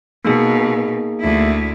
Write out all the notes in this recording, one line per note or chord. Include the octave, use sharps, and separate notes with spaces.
B2 A#3 D#4 G#4
D2 E4